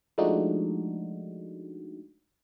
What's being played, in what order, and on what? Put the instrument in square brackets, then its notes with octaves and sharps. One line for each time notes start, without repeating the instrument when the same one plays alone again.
[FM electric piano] F3 G#3 A3 D4 D#4 F#4